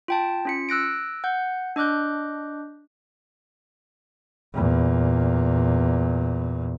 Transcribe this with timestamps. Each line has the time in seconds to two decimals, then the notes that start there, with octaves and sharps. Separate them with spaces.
0.08 F4 G5 A5
0.45 C#4 F4 C#7
0.69 E6 F#6 A#6 D7
1.24 F#5 G6
1.76 D4 D#5 D6 F#6 G6
4.54 E2 A#2